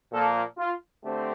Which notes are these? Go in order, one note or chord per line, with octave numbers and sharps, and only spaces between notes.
A#2 F3 A#3 A4
F4
D3 A3 C4 G4